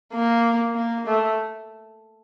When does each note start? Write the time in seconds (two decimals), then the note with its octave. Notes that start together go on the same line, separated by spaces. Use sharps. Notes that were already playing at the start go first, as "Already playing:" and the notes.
0.12 A#3
0.75 A#3
1.07 A3